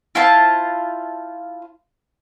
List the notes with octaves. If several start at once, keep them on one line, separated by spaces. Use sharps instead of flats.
E4 F4 C5 A5